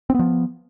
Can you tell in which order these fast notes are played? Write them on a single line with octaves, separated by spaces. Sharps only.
C4 B3 F3